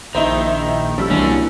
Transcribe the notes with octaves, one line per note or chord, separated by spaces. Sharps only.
A#1 D#3 D#4 E4 C5
A1 F3 G3 E6
C2 E3 F#3 A#3 C#4 D4